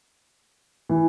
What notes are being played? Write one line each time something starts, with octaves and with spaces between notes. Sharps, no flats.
E3